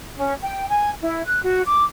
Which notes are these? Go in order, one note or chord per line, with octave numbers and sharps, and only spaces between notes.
C#4
G5
G#5
E4
F#6
F#4
D6